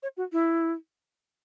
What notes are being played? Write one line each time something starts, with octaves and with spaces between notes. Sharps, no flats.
C#5
F#4
E4